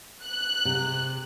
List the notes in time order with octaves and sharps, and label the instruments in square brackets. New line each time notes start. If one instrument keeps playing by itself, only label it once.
[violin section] F#6
[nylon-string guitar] C3